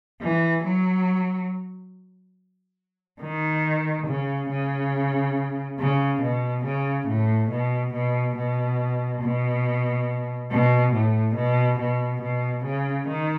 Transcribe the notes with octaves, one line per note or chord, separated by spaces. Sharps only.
E3
F#3
D#3
C#3
C#3
C#3
B2
C#3
A2
B2
B2
B2
B2
B2
A2
B2
B2
B2
C#3
D#3